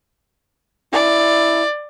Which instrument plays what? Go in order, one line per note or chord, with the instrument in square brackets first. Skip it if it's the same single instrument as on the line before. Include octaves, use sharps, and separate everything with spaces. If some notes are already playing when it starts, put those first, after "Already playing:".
[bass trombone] E4 [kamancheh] D5